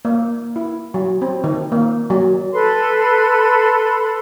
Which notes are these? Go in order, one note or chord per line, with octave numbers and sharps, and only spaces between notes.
A#3
E4
F#3
C4
D#3
A#3
F#3
A4 B4 B5 C6